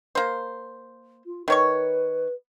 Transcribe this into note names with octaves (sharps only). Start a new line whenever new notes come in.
A#3 C5
F4
D#3 B4 C#5 C#6